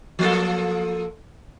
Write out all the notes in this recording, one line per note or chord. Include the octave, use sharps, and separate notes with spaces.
F3 A#3 A4